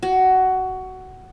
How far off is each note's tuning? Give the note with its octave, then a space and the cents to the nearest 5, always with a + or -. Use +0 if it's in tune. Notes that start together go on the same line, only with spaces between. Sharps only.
F#4 +15